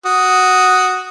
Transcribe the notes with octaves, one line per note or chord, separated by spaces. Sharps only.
F#4 D#6